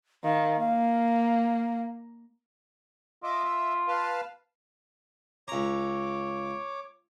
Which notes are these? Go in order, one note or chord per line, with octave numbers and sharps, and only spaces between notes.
D#3 F5
A#3 F5
F4 D#5 E5 D6
E5
B4 F5 A5
C#2 C#5 A#5 D6